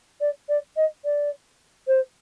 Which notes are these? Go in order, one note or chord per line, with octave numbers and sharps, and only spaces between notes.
D5
D5
D#5
D5
C5